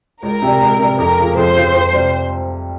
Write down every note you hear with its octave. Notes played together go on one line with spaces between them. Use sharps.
C#2 A#4
C3 G3
C#2
C3 G3
F2 A#4
C#3 F3
F2 C5
C#3 F3
F2
C3 G3